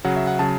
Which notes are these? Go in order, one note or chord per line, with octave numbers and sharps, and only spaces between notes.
C#3 F#3 F#5
E5
F#5
C#3 F#3 A5